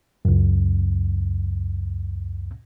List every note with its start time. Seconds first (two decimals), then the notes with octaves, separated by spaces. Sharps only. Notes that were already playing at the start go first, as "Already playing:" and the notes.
0.25 C#2 F#2